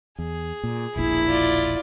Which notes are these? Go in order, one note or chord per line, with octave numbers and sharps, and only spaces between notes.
E2 G#4
A#2
E1 A#1 A#2 E4
F4 D5